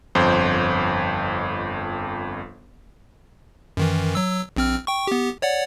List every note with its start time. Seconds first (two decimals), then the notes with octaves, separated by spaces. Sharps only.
0.15 G1 F2 C5
3.77 F#2 D#3 E3
4.15 F#3 E6
4.56 A#1 C4 F6
4.87 G5 C#6
5.07 B3 G4
5.42 C#5 D5 F#5